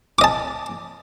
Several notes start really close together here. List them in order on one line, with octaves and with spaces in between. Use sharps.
D6 D#5 A5